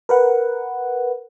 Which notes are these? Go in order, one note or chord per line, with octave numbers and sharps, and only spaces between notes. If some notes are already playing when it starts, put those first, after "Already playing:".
A#4 B4 F#5